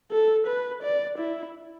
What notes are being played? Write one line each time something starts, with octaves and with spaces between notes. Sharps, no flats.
A4
B4
D5
E4